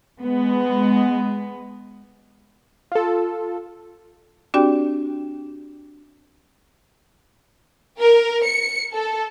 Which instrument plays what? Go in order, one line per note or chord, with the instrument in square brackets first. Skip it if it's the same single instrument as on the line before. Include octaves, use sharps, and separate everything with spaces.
[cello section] G#3 B3
[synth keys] F4 A4
[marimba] C4 D4 F#4 G4 D5 G5
[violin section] A#4
C#7
A4